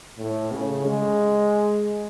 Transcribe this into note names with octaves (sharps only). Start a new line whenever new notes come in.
A2
C#3
G#3